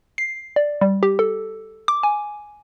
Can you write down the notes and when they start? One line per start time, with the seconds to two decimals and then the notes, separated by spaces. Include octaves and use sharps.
0.18 C7
0.56 D5
0.81 G3
1.03 G4
1.19 A4
1.88 D6
2.03 G#5